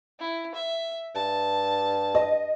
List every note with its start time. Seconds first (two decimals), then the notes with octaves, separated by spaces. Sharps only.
0.19 E4
0.54 E5
1.15 G2 A5
2.15 D#5